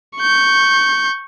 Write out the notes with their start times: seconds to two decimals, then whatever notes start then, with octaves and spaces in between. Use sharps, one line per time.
0.17 C#6 G6